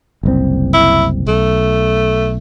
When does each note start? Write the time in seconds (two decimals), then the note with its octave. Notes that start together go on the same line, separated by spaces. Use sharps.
0.23 F#1 C2 C4
0.73 E4
1.27 B1 A3